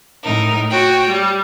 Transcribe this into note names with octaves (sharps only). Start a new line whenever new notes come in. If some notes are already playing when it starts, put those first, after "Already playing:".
A2 D#4 A#4
F#4 C#5 G5
G3